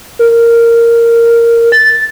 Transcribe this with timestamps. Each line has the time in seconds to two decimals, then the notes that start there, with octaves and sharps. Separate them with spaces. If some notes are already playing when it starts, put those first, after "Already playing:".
0.19 A#4
1.72 A6